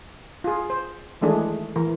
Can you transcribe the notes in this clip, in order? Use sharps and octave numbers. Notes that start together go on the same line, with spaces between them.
F4 G#4
C5
D#3 E3 G#3 A3 D4 G#4
E3 A#4